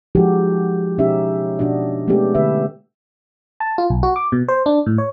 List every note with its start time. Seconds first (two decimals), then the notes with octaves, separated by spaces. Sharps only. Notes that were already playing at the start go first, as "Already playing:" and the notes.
0.15 F3 G#3 D#4 F#4 G4 A4
0.98 B2 C#4 D#4 G4 E5
1.59 B2 D4 F#4 D#5
2.07 G#3 A3 B3 C#4 G4 A4
2.35 D3 A3 B4 E5
3.60 A5
3.78 F4
3.90 B1
4.03 F#4
4.16 D6
4.32 B2
4.48 C5
4.66 D4
4.86 A2
4.98 C#5